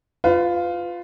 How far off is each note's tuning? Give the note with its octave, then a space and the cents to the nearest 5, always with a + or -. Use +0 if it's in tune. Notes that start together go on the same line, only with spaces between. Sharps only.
F4 +0 B4 +30